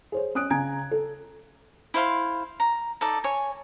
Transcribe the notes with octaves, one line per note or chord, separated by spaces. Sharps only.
G#4 C5 C#5
C#4 D#6 F#6 D7
C#3 G#5 A#5 G#6 D7
A4
E4 C5 F5 C6
A#5
D#4 A4 D5
C#5 G#5